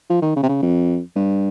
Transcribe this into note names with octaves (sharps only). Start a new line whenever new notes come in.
F3
D#3
C#3
C3
C#3
F2
G2